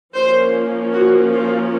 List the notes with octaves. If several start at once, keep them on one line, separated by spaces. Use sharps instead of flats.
F3 A#3 C#4 C5
F#4
F4